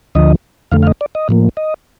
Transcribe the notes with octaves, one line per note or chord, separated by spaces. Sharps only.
D2 D3 F3 D#5
F2 D3 A3 F5
F5
D#5
D5
D#5
A2 F3 A#3
D#5